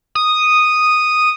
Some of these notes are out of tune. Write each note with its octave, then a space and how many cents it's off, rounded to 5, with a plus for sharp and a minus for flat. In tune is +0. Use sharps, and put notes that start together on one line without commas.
D#6 -5